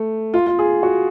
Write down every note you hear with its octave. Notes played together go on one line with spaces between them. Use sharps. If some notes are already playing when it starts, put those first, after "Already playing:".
Already playing: A3
F4
F4
G#4
F#4